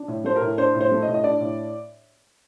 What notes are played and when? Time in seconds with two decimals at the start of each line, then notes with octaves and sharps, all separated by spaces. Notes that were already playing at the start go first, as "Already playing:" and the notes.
Already playing: D4
0.08 A2
0.24 A3 C5
0.36 A#4
0.42 A2
0.58 D4 C5
0.74 A2
0.81 C5
0.91 A3
1.02 D#5
1.08 A2
1.14 D#5
1.24 D4 D5
1.40 A2